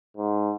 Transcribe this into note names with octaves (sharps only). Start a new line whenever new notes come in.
G#2